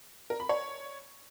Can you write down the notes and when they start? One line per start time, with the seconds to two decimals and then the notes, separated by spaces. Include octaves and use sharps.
0.30 A#4
0.40 B5
0.49 C#5